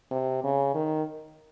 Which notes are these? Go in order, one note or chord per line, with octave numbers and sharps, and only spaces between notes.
C3
C#3
D#3